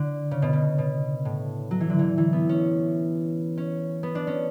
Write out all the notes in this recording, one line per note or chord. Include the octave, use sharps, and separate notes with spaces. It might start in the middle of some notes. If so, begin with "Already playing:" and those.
Already playing: D3
C#3
B2
C#3
B2
A2
F#3
E3
D3
E3
E3
B3
C#4
C#4
B3
D4
C#4